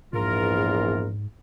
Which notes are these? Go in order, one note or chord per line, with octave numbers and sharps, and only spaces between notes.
A#1 E2 G#2 F4 A#4